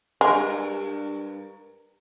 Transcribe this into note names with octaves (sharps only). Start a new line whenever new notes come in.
G2 G#3 A#4